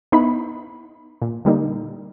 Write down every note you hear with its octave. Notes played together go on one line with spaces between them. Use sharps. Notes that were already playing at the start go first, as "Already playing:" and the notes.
B3 D#4 E4 B5
A#2
D3 G3 A#3 D#4